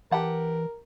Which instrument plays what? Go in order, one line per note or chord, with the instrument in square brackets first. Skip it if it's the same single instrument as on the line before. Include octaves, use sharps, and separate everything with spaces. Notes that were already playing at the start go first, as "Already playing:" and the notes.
[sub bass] E3 [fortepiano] G4 F#5 A5 [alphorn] A#4